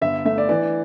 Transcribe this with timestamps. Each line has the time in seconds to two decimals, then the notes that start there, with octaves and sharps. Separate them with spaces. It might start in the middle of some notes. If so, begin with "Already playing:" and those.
0.01 G1 E5
0.25 A3 E5
0.38 D5
0.49 E3 D5